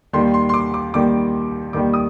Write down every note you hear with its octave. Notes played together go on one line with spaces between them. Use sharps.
D#2 D#3 G3 C6
C6
C6
D6
D6
D#2 D#3 G3 D6
D#2 D#3 G3 D6
D#6